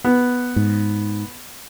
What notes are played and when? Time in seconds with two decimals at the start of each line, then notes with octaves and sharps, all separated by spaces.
0.05 B3
0.56 G#2